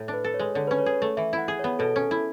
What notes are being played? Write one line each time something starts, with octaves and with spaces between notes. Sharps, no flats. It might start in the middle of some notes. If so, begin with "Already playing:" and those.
Already playing: A2
D4
B4
A4
C#5
G#3
D3 C#5
C#4 B4
C#5
G#4
A3
E3 E5
E4
F#5
G#4
B3 C#5
B2 A4
C#4
E4